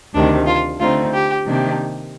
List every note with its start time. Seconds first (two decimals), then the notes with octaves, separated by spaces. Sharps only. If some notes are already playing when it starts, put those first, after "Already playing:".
0.14 D2 C3 D#3 D4
0.47 F4
0.80 D3 A3 C4 D#4 F4
1.13 G4
1.46 C3 D#3 A#3 D4 G4